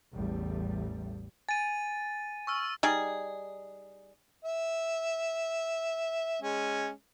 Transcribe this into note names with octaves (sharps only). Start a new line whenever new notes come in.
A1 E2 G3 A3
G#5 A6 D#7
C#6 E6 F6
G3 D#4 G#4
E5
G#3 C#4